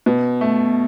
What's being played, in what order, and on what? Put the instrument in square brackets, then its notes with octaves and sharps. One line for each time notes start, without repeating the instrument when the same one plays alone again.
[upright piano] B2
A3